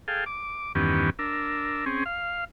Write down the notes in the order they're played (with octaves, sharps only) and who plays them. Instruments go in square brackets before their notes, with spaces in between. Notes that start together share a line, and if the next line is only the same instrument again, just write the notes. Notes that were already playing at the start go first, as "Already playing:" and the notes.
[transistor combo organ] G#4 A4 F5 G5
D6
E2 G2 D#3 B3 C#4 G4
D4 A#4 E6
C4 C#4 G#4
F5